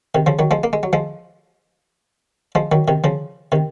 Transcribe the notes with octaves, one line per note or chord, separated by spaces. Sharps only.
C3 D#3
C#3 F3
D#3 F#3
F3 G#3
A#3
G#3
F#3
F3 G#3
F3 G#3
D#3 F#3
C3 D#3
C#3 F3
C3 D#3